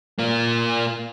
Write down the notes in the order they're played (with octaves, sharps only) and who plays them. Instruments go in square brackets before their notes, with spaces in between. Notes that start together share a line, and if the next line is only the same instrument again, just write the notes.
[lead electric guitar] A#3 F4